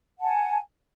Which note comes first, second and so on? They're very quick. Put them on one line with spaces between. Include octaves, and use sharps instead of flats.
F#5 A5 G#5